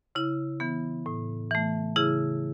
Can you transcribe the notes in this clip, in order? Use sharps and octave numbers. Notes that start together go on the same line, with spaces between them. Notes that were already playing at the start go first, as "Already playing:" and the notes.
C#3 E4
E3 B3
A2
E3 A3
C#3 E4 G#4